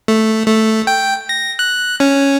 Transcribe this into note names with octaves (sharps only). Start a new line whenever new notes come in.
A3
A3
G5
A#6
F#6
C#4